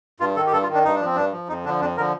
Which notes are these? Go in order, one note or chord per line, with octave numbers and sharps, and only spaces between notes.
G2 F4
D#3 A4
G4
G2 A4
F4
D#3
D4
G2 D#4
D4
F3 C4
G2 D4
F3
F2 D#4
D3 F3 D4
F2 D4
D3 F3 A#4